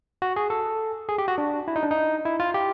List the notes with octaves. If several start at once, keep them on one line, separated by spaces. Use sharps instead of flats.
F#4
G#4
A4
G#4
G4
F#4
D4
E4
D#4
D4
D#4
E4
F4
G4